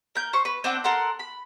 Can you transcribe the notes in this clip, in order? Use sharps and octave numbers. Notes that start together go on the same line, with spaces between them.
A#4 G6
C5 C#6
B4
C4 D4 F#5 G5
A4 A#4 F#5 C6
B5